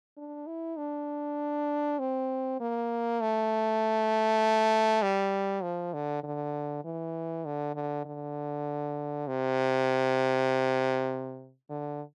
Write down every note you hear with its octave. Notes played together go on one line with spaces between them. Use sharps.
D4
E4
D4
C4
A#3
A3
G3
F3
D3
D3
E3
D3
D3
D3
C3
D3